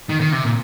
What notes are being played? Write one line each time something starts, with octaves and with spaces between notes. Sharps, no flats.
D#3
D#3
C3
A#2